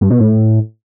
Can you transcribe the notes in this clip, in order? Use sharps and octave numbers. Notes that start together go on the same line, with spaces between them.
G2
B2
A2